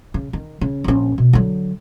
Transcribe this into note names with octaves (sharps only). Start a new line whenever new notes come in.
C#3
D#3
C#3
A#1 C#4
B2
D3 F#3